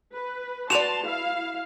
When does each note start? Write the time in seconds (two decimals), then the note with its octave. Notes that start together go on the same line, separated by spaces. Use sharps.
0.14 B4
0.70 F#4 B4 D5 A5 C6 E7 F7
1.04 E4 F5